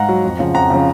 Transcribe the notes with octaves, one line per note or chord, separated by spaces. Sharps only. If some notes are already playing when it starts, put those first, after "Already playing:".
Already playing: G#2 F5 F#5 A#5
F#3
F2
C#3 F3
F2 F#5 A#5
C#3 F3